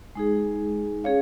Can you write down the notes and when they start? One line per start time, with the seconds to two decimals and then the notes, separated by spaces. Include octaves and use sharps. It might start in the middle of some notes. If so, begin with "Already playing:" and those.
0.15 G#3 D#4 G#4
1.04 C#4 G#4 C#5 F5